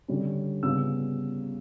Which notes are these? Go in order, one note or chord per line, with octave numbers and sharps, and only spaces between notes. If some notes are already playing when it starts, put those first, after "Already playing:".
D3 G3 C#4
C#3 G3 B3 E6